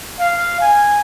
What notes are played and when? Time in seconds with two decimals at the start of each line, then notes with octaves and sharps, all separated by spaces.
0.19 F5
0.61 G#5